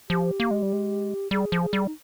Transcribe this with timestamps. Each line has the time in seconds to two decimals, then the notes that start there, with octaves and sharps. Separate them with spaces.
0.10 F3 G4
0.40 A#3
0.51 G#3
0.62 G3
0.73 G#3
1.31 G3 G#4
1.52 F3
1.62 G#4
1.73 G3
1.86 D#4